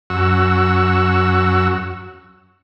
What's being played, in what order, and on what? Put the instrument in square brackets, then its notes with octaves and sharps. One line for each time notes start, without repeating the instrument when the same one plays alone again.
[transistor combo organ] F#2 F#4 E6